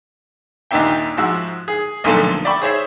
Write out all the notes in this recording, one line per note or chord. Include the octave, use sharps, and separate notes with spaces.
D#2 A#2 D4 D#4 E5 G5
G#2 F3 F#4 E5 E6
G#4
B1 A#2 D3 F3 A3 A4
D5 E5 G5 B5 C#6
G#4 C5 C#5 E5